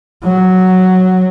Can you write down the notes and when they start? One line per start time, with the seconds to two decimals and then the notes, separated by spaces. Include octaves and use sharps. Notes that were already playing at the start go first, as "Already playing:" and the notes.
0.23 F#3